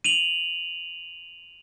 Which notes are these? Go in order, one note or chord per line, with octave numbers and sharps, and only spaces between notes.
D#7 F7 F#7